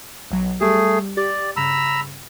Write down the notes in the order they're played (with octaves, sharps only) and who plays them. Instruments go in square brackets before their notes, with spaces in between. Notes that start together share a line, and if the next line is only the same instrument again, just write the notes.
[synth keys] B1 F#3
[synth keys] G3 G4 [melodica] A3 G#4
[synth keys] G4 [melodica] D5
[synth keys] G2 C#3 [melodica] A#5 B5 E6